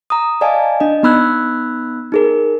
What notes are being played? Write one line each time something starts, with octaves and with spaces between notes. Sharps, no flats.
A#5 D#6
D5 D#5 F5 G#5 A5
D4 D#5
B3 D#4 B5 E6 F#6 G#6
D#4 G#4 A#4